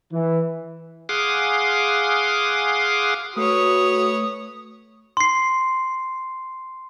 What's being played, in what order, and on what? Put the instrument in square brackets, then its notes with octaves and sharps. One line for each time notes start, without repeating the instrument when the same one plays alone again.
[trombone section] E3
[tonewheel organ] G#4 F5 F#5 C6 D6 D#6
[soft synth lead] A3 [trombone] F#4 [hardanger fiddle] B4 C#5 [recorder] D#6
[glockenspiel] C6 C7